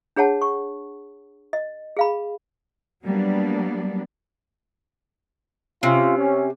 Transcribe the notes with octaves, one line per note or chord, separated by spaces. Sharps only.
D4 G#4 C#5 F#5 A5
C#6
D#5
G#4 F5 B5
F#3 G3 A#3 B3 D4
C3 C#4 F4
C#4